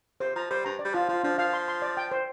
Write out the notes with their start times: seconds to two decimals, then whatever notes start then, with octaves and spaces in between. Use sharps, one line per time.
0.20 C3 C5
0.36 F3 A#5
0.50 G3 C5
0.65 G2 A#5
0.79 D5
0.85 G3
0.94 F3 F4
1.09 F3 F4
1.24 F3 D4
1.38 F3 F5
1.53 C6
1.68 C6
1.82 D5
1.97 G5
2.12 C5